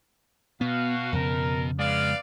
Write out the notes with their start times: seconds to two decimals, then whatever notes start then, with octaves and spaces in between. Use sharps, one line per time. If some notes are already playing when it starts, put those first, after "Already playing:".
0.61 B2 B3 F#4 F5
1.12 F2 C#3 A#4
1.79 G#3 B3 D5 F5